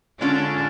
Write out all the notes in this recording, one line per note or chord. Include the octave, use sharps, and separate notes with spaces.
D3 G#3 C#4 D4 F4